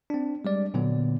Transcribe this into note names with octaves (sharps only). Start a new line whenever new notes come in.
C4 D4
G3 G#3 D5
A#2 D3 F#3 B3